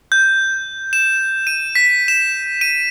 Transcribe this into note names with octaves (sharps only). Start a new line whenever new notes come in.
G6
E7
D#7
B6
E7
D#7